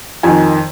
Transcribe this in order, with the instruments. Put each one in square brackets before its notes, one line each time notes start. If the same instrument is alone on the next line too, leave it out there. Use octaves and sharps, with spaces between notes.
[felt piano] F2 D#3 G#5